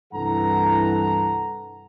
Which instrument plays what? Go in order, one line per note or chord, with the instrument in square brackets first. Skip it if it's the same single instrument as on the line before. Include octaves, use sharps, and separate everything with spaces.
[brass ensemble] C2 G2 E3 A4 F#5 A#5